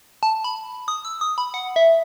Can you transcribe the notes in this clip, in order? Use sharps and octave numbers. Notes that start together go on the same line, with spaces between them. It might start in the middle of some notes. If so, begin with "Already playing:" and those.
A5
B5
D#6
E6
D#6
B5
F#5
E5